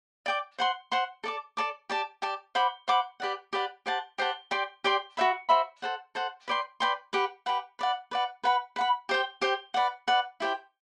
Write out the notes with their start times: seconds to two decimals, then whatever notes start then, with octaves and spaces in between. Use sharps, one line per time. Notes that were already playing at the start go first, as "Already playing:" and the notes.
0.26 D5 G5 D6
0.59 C5 F#5 C6
0.92 C5 F#5 C6
1.24 A4 D5 A5 D6
1.57 A4 D5 A5 D6
1.89 G4 D5 A5
2.22 G4 D5 A5
2.55 C5 F#5 B5 D6
2.88 C5 F#5 B5 D6
3.20 G4 B4 D5 F#5
3.53 G4 B4 D5 F#5
3.86 G4 C5 F#5 A5
4.18 G4 C5 F#5 A5
4.51 G4 D5 G5 C6
4.84 G4 D5 G5 C6
5.17 F#4 C5 E5 B5
5.49 F#4 C5 E5 B5
5.82 A4 C5 F#5
6.15 A4 C5 F#5
6.48 B4 D5 G5 C6
6.80 B4 D5 G5 C6
7.13 G4 B4 F#5
7.46 G4 B4 F#5
7.79 B4 D5 F#5
8.11 B4 D5 F#5
8.44 B4 F#5 B5
8.76 B4 F#5 B5
9.09 G4 C5 G5
9.41 G4 C5 G5
9.74 B4 D5 F#5
10.08 B4 D5 F#5
10.40 E4 G4 C5 G5